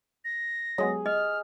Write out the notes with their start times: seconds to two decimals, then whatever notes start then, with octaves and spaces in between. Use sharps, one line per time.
0.25 A#6
0.78 F#3 G#3 B3 G#4
1.06 D#5 F6